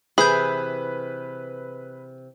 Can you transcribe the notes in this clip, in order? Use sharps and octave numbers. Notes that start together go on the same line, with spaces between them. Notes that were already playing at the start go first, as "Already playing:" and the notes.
C3 E3 E4 G#4 B4 B5 G6